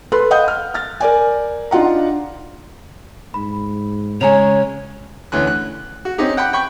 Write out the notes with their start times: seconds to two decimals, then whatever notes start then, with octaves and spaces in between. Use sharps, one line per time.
0.12 A4 B4 B5 C6 F#6
0.31 D#5 F5 F#5 D#6 G6
0.48 F6
0.74 F6 A6
1.00 A#4 D5 G#5
1.71 D4 D#4 F4 F#5 A#5
3.34 G#2 B5
4.21 C#3 G#3 C#5 G#5 A#5 F7
5.32 D2 E3 C#4 F#6
5.47 F#6
6.05 F#4
6.18 C4 C#4 D#4 G4
6.37 F#5 G5 B5 F#6
6.53 G5 B5 C#6